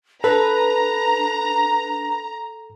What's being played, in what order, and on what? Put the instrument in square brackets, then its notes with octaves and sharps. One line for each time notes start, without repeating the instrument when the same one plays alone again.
[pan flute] D4 [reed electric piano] A4 [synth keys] B4 [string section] A#5